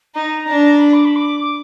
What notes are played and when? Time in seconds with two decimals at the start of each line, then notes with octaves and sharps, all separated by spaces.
0.15 D#4 A#5
0.46 D4
0.77 B5
0.94 D6
1.05 B5
1.16 D6
1.41 D6